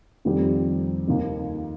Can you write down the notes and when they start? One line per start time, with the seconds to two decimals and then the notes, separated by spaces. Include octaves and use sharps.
0.25 F2 D#3 G3 C4 G4
1.07 D#2 D#3 A#3 D#4